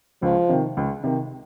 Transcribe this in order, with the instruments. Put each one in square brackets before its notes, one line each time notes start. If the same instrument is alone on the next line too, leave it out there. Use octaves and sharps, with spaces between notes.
[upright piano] C#2 [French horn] F3
[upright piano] C3 D#3
C#2
C3 D#3